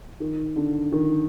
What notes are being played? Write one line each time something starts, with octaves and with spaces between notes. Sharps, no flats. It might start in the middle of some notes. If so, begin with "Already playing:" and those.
D#3
D3
D#3